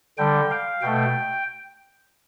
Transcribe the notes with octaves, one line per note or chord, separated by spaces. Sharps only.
D3 G3 G5
F5
B2 A3 G5